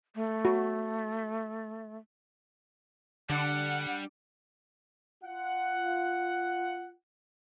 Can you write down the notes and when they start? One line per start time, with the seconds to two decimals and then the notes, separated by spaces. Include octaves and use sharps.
0.16 A3
0.45 F#4
3.30 D3 G3 D4 F#5
5.24 F4 F#5